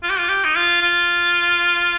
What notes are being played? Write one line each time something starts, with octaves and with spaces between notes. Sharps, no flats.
F4
G4
F4
G4
D#4
F4
F4